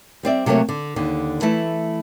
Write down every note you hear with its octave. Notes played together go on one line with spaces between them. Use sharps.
G3 C4 D5 E5
C3 F#3 A3 A#3 F#4 C#5
D3
D#2 D3
E3 A3 E4 A5